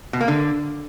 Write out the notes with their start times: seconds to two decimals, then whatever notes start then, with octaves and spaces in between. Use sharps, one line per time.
0.13 B2
0.21 A#3
0.28 D3